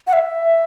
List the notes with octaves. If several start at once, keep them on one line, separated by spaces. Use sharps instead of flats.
F#5
E5